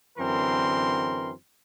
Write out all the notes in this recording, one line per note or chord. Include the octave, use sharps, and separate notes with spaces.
F#2 D3 E3 C4 A#4 C6